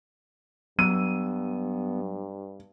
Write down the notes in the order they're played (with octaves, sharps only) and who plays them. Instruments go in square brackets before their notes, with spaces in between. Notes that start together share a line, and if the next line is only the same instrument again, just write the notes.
[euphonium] G2 [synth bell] F#3 [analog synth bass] B3 [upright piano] D#7